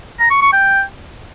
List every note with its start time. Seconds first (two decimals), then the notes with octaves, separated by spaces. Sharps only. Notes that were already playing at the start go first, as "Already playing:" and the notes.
0.20 A#5
0.31 C#6
0.42 C#6
0.53 G5